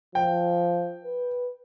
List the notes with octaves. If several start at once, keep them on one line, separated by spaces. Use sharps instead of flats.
F3 G5
B4